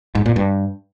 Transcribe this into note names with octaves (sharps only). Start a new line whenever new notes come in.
G#2
A#2
G2